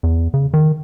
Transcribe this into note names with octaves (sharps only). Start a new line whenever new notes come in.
E2
C#3
D#3